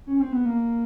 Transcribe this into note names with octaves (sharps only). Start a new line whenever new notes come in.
C#4
C4
B3
A#3